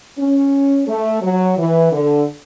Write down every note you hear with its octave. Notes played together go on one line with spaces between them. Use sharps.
C#4
A3
F#3
E3
D3